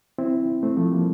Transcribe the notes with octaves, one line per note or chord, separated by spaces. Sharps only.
C4 E4
A3 C4
F3 A3
G3 A#3